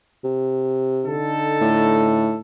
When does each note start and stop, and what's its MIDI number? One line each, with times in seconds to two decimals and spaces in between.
0.24 1.16 48
1.05 2.38 50
1.05 2.38 63
1.05 2.38 69
1.61 2.39 45